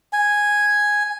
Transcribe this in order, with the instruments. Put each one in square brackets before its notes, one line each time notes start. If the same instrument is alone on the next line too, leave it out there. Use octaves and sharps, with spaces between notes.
[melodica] G#5